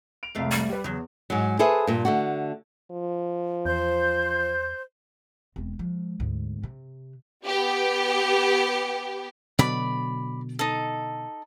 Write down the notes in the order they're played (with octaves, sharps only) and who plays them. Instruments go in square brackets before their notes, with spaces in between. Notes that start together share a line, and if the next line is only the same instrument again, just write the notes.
[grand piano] D7 F7
[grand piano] C2 F2 G#3 [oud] C3 A3 F5
[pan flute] G3
[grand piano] G4 B4
[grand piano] E2 [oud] C#3 F#3
[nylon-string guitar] G#2 F#3
G#4 A4 B4 C5 E5
G2 A#2
D3 A3 F#4
[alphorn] F3
[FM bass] E2 [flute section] C5 [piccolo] G6
[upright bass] E1 C4
F3 G#3
D2 G#2
C3
[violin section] B3 G4
[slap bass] B2 D3 F#3 [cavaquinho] D5 B5
[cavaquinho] D#4 A4